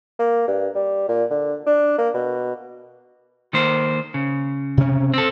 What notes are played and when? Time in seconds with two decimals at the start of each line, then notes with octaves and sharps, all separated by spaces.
0.19 A#3
0.48 G2
0.75 G3
1.08 A#2
1.30 D3
1.67 D4
1.98 A#3
2.14 B2
3.53 D#3 A#3 C5
4.14 C#3
4.77 C3 C#4
5.14 C4 A4